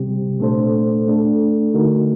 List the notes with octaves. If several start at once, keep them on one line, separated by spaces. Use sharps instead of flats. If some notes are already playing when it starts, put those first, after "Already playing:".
Already playing: C3 G3 C4 G4
A#2 A3 D4 A4 C5
A3 D4 A4
D3 A3 D#4 F#4 A#4